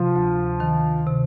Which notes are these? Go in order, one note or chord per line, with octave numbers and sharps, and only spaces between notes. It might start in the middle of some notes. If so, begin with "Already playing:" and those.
Already playing: C3 F3 F4
D2
D#3
C3